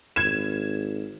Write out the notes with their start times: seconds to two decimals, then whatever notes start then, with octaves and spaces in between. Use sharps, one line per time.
0.16 G#1 G#6 E7